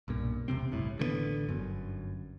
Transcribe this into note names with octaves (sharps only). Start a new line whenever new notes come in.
B1 G2 A#2
E1 C3 C4
F#1 C2 A2
A1 D3 F#3 B3
G1 F#2